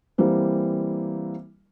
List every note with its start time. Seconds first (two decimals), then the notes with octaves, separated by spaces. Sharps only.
0.18 E3 G3 A#3 C4